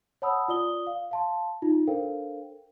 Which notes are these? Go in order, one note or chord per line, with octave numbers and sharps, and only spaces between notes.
C#5 F#5 A5 B5 D#6 E6
F4 D5 D#6 G7
F5
F5 A5 C6
D#4 F4
D4 A4 A#4 C5 F5 G5